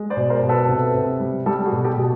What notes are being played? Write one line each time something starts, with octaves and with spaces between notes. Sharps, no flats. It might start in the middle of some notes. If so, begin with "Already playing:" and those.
Already playing: G#3
C5 D5
B2
A#4 C5
B2
A4 B4
C3
C3
G3
G3 G4 A4
F#4 G#4
B2
G4 A4
B2